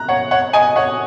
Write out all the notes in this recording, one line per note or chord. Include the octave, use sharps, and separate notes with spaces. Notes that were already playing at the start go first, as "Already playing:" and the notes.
Already playing: A#5 F#6
C#5 F#5
C#5 F#5
D#5 G#5
C#5 F#5